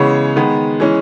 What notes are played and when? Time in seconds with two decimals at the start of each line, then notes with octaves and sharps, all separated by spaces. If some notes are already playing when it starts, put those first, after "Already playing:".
Already playing: C#3 E3 G#3 B3 C#5
0.36 D#3 G#3 B3
0.80 E3 G#3 C#4